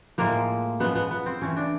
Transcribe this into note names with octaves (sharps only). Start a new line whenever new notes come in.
A2 F3 G#3 A#3
C#3 F3 G#3 B3
B3
B3
C4
C#3 E3 A3 C#4
D4